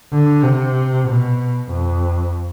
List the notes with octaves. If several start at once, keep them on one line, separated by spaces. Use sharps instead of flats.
D3
C3
B2
F2